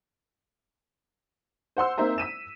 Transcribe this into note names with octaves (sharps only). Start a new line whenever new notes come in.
C5 F#5 C6 E6
A#3 C4 D#4 C5 E5 A#5
E6 B6 D#7 E7